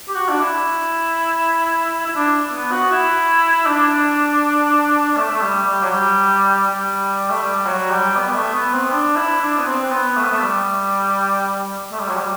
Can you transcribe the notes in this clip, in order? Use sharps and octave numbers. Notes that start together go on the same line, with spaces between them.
G4
F#4
D4
E4
E4
D4
B3
F#4
E4
D4
A3
A3
G3
G3
F#3
G3
G3
A3
G3
F#3
G3
B3
G3
A3
B3
C4
D4
E4
D4
B3
C4
B3
A3
B3
A3
G3
A3
G3
F#3
G3